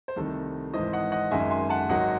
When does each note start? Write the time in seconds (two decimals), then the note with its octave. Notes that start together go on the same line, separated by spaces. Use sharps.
0.08 C5
0.16 C2 C3 D#3 A3 A4
0.74 G#1 G#2 E3 C5 D#5
0.93 D#5 F#5
1.12 D#5 F#5
1.31 G#1 F#2 D#3 G#3 E5 G#5
1.51 G#5 C6
1.69 F#5 A5
1.89 G#1 G#2 F#3 D#5 F#5